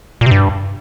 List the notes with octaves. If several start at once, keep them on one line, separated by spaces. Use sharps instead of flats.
A#2
C3
G2